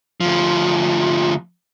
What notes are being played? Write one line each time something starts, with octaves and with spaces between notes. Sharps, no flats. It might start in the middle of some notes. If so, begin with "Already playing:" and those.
D2 F3